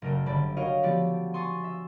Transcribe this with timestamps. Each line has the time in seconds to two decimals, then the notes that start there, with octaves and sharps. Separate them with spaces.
0.02 F#1 A3 A#4 G5
0.26 G1 D3 B4 D5 G5 B5
0.57 F#4 A#4 C#5 D#5 F5 G5
0.83 F3 A3 B3 F#4 G4 D5
1.34 G#5 C6 C#6 D#6 A6
1.64 E5